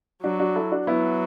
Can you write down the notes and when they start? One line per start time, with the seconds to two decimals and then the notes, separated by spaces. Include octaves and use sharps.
0.23 F#3 D4 F#4
0.40 D4 F#4
0.55 E4 A4
0.72 D4 F#4
0.87 F#3 B3 E4